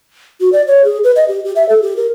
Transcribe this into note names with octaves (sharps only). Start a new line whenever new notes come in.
F#4
D5
C#5
G#4
B4
D#5
G4
G4
E5
A4
G4
A#4